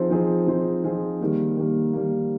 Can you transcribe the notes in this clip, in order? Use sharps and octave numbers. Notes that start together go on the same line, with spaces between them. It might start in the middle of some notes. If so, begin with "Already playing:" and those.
Already playing: F3 C4 D#4 G#4 C5
F3 C4 D#4 G#4 C5
F3 C4 D#4 G#4 C5
F3 C4 D#4 G#4 C5
D#3 G3 A#3
D#3 G3 A#3
D#3 G3 A#3